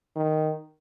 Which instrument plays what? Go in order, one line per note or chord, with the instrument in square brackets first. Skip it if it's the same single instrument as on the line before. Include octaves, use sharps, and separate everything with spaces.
[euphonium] D#3